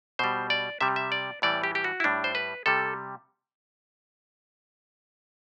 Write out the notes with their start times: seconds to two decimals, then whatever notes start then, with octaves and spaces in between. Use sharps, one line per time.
0.19 B2 G3 C5
0.50 D5
0.81 C3 G3 E5
0.96 E5
1.12 D5
1.42 A2 E3 G3 D5
1.64 G4
1.75 G4
1.84 F#4
2.00 E4
2.04 A2 G3 D4
2.24 C5
2.35 B4
2.66 C3 G3 A4